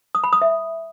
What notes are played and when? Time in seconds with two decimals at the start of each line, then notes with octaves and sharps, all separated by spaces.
0.15 D#6
0.24 B5
0.33 D#6
0.42 E5